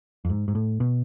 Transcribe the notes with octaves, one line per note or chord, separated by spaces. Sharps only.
F2
G#2
G#2
A2
B2